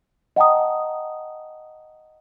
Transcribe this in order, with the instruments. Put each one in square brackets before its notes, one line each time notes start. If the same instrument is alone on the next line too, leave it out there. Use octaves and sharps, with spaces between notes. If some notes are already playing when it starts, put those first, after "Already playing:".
[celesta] D#5 F#5 G5 A5 A#5 D#6